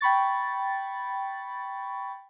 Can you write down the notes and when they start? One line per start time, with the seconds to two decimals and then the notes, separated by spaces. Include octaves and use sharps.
0.01 G5 B5 C#6 A6